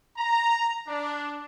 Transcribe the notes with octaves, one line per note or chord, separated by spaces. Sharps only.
A#5
D4